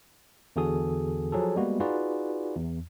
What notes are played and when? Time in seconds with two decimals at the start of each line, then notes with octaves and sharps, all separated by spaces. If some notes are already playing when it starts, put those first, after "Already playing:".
0.56 E2 D3 F#4 G#4 A4 D#6
1.32 F3 F#3 G#4 A4
1.56 G3 G#3 A#3 B3 F#4
1.80 D#4 F4 F#4 G#4 B4 D5
2.55 E2